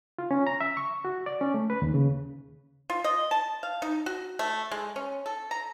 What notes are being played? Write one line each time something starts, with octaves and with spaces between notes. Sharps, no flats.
F4
C#4
A#5
E5
C#6
F#4
D5
C#4
A3
B4
D#2
C#3
F4
D#5
A5
F5
D#4
F#4
A3
G#3
C#4
A4
A#5